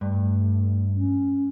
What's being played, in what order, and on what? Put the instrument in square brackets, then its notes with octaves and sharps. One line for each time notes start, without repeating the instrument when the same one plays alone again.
[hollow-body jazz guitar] G2 [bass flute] A3
[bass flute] C#4